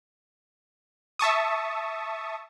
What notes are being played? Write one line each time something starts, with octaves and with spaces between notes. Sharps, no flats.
E5 A5 C#6 D#6